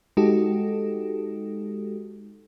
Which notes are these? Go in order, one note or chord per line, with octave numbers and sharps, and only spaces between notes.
G#3 D#4 F#4 G4 A4